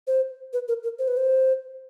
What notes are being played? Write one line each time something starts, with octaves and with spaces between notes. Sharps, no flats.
C5
B4
A#4
A#4
C5
B4
C5